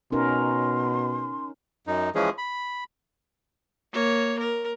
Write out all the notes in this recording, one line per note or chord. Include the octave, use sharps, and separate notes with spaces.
B2 C#4 D#4 A#4 C6
F#2 D#4
E3 F3 G#3 C#4 G#4
B5
A#3 C#5
A#4